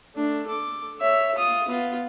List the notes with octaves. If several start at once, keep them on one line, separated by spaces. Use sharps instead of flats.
A3 D4
A4 D6
C#5 E5
F4 D#6
B3 F4